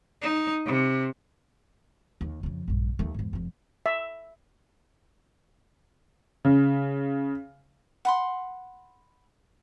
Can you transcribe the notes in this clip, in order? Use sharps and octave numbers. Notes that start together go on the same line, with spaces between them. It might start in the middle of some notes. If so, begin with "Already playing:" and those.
D#4
C3
D#2
F2 C#3
A#1 G2
D#2 A3
E2 G#2
F1 F2
E5
C#3
F#5 B5 C6